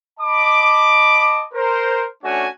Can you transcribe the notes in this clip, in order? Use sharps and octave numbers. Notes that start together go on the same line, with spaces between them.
D#5 A5 B5 D6
A#4 C5
A3 C#4 D4 F#4 C#5 G#5